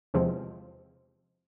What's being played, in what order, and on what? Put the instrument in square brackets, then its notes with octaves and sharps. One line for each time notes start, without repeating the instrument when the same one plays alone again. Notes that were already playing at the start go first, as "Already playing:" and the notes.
[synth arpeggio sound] E2 C3 F3 G#3 C4